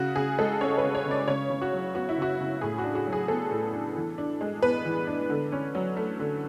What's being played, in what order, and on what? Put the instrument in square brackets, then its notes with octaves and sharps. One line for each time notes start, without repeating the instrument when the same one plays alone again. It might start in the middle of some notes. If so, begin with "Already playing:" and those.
Already playing: [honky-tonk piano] C#3 F#4
C#3 G#4
G#3 A4
C#4 C#5
B4
C#3
C#5
C#3
D5
C#3 C#5
C#3
F#4
F#3
B3 F#4
E4
C#3 F#4
C#3
A2 G#4
F#4
D4
F#4
F#3
G#4
B3 A4
A2
D4
E3
D4
G#3
B3 B4
E3
D4
D3
C#4
F#3
A3
D3